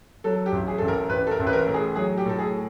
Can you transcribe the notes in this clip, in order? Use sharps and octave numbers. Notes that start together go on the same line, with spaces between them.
F#3 A4
G4
A1
G#4
A1 A4
A#4
A1 B4
A4
A#4
A1
B4
A#4
A2
G#4
F#3 G#4
G4
A2 A4
G#4